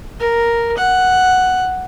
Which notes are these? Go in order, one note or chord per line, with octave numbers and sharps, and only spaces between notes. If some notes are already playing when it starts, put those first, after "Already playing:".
A#4
F#5